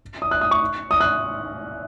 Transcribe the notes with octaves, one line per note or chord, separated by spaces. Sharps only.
D#6
F#6
D#6
C#6
D#6
F#6